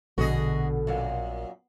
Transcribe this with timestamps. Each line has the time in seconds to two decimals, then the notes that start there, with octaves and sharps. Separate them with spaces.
0.18 A#1 B2 D3 F#4 G#4 D#5
0.87 F#2 A#2